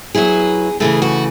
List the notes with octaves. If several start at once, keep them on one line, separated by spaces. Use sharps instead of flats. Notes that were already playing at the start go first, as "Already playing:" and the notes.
F#3 B3 E4 G#4
C#3 E3 A3 G#4
F#4